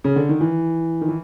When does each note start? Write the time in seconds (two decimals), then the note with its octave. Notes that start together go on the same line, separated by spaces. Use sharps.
0.04 C#3
0.16 D3
0.29 D#3
0.41 E3
1.01 D#3
1.08 E3